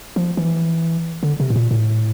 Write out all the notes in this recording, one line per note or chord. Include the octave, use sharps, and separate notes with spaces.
F3
E3
D3
C3
A2
A#2
A2